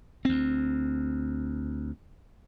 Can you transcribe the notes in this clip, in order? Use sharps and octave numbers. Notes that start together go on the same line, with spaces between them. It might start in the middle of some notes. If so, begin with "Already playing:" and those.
D2 C4